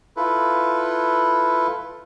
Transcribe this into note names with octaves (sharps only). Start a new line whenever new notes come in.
E4 F4 A4 B4